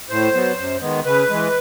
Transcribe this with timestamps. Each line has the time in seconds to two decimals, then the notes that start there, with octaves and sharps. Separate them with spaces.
0.10 A2 C5
0.34 F#3 B3
0.57 F#2
0.81 D#3 G#3 B3
1.05 C#3 B4
1.29 E3 G#3